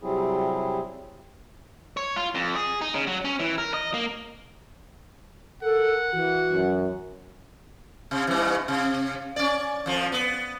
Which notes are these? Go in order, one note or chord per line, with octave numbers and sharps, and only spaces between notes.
C3 F#3 G3 C4 E4 G#4
C#5
F4
F2
G#4
D#4
C#3
F#3
C#4
E3
A#4
D#5
A#3
A4 A#4 F#5
E3 F#4
F#2
C3
G2 E3
C3
C#4 D5
F2 F3
B3